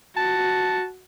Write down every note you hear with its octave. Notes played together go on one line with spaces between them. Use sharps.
F#4 A5